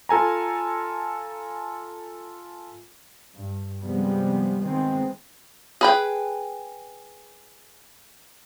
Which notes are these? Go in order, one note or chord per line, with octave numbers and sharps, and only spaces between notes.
F4 A4 G#5 A#5
G2
G2 C3 F3 G3 G#3 B3
D#3 G#3 B3 C4
G#4 B4 G5